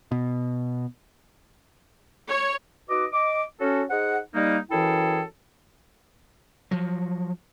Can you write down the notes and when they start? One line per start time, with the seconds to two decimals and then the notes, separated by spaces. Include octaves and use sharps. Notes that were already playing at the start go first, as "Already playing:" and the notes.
0.11 B2
2.29 C#5
2.89 D#4 F#4 B4 D#5 D6
3.13 D#5 D6
3.61 C#4 F#4 A4
3.90 D#4 G#4 C5 F#5
4.34 G3 A#3 D#4
4.71 F#2 E3 E4 G#4 A4 G5
6.71 F3 F#3